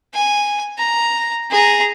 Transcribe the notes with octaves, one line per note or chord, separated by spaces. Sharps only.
G#5
A#5
G#4 A#5